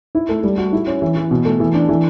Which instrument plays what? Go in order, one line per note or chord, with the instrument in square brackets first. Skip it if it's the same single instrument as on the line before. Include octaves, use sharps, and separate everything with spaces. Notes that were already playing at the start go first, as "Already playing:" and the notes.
[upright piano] E4
A3
G3
F#4
E4
C#4
E3
E3
B2
A3
E3
D4
E3